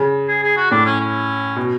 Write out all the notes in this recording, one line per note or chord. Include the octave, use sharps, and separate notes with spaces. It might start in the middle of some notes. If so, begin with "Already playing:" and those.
Already playing: C#3
G#4
G#4
F#4
A2 D4
C#4
C#4
B2